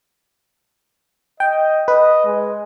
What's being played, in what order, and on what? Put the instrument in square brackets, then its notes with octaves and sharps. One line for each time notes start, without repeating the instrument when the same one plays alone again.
[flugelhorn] D#5 [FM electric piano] G5
[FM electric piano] B4 [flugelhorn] D#5
[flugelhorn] G#3